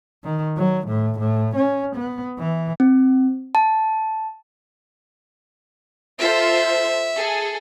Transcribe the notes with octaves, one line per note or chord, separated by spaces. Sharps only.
D#3
F#3
A2
A2
C#4
B3
E3
C4
A5
F4 A4 C5 E5
G#4 A4